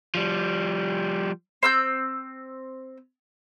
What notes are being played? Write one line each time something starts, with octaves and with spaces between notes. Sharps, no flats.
F3 G3
C4 E6 G6